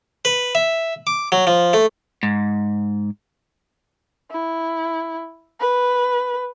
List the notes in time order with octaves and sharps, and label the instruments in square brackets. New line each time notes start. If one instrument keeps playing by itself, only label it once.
[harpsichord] B4
E5
D6
F#3
F3
A3
[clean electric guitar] G#2
[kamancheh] E4
B4